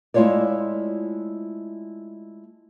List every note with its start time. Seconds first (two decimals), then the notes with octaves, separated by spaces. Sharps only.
0.14 G#3 A3 E4 F4 C#5 D5